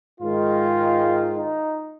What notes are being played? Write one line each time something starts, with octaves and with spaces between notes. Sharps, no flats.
G#2 D#3 G#3 F4
D#4